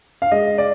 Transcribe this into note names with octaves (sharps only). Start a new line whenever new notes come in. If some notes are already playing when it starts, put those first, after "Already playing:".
F5
G#3 D#5
D5